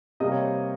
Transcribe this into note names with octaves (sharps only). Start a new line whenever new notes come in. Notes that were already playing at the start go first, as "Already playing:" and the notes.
C3 G3 A#3 D#5
C#5
C5